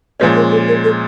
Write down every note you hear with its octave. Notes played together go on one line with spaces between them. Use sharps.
A#2 F3 G#3 C#4 B4
A#4
A4
A#4
A4